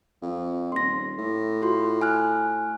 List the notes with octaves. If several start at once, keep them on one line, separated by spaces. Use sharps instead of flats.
F2
D#1 C6 A#6
A2
F4 F#4 C6
G#5 F6 F#6